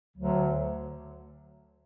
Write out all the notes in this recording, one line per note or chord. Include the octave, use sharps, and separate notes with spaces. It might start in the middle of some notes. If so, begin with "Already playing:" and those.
D2 D3 F#3